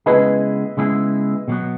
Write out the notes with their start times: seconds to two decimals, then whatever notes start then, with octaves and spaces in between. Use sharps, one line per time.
0.06 C#3 G#3 B3 E4 G#4 B4 D#5
0.77 C#3 G#3 B3 E4 G#4
1.48 B2 F#3 B3